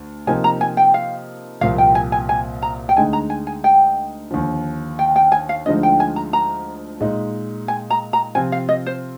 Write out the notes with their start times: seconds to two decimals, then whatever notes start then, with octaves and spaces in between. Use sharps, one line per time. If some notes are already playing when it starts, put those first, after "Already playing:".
Already playing: D2
0.27 C3 F3 A#3 D#4 G#5
0.44 A#5
0.61 G#5
0.77 G5
0.94 F5
1.61 C2 A#2 F3 A#3 F5
1.78 G5
1.95 G#5
2.12 G#5
2.29 G#5
2.62 A#5
2.89 G5
2.96 D2 D3 G#3 D#4 G#5
3.13 A#5
3.30 G#5
3.47 G#5
3.64 G5
4.31 D#2 D3 F3
4.99 G5
5.16 G5
5.32 G#5
5.49 F5
5.66 D2 D3 F3 G#3 D#4 D#5
5.83 G5
6.00 G#5
6.16 A#5
6.33 A#5
7.01 A#2 G#3 D#4
7.68 G#5
7.90 A#5
8.13 A#5
8.35 C3 F3 C4 F4 G#5
8.52 F5
8.69 D#5
8.86 C5